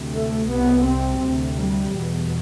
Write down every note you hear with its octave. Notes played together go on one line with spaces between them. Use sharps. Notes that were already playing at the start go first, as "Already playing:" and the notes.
Already playing: D2 C3
A3
C2 C3 B3
C4
D2 C3
G3
E2 B2